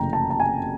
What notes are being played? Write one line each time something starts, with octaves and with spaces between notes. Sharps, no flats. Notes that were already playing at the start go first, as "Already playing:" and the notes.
Already playing: F#1 F2 C3 E3 A3 G5 A#5
A5
A5
G#5